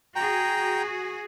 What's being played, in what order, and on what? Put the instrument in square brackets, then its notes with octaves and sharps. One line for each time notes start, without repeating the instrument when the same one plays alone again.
[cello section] F#4 G#4 [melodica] G5 A#5